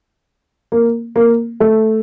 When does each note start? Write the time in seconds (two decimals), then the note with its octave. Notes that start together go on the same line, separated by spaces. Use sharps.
0.72 A#3
1.16 A#3
1.60 A3